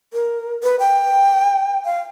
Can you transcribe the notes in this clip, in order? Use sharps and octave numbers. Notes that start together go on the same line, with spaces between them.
A#4
B4
G5
F5